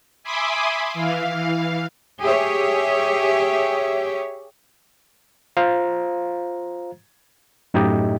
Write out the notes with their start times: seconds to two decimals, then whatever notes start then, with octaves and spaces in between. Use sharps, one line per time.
0.23 E5 G#5 B5 C6 D6 D#6
0.94 E3 F5
2.22 G4 G#4 C#5 E5
5.57 F4 C5 F5 A#5
7.74 F#2 A2 D#4 E4 G4 D#5